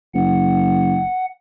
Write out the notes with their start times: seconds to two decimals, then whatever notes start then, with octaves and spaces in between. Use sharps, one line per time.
0.15 F#1 F#5